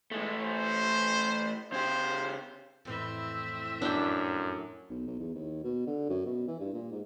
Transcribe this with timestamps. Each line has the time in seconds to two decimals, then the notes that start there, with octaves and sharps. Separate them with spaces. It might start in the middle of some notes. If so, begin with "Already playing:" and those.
0.11 E3 G#3 A3
0.43 C5
1.72 C#3 G4 C5
2.85 F2 A2 E3 C4 E5
3.82 F#2 D4 E4 G5
4.89 B1
5.07 B1
5.19 E2
5.34 D#2
5.64 B2
5.87 D3
6.09 F#2
6.26 B2
6.47 E3
6.60 G2
6.74 A#2
6.92 G#2